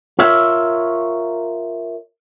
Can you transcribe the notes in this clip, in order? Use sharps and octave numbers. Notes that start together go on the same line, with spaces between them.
F4 A#4 C#5 E5